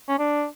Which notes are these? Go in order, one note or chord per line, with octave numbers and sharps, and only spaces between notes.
C#4
D4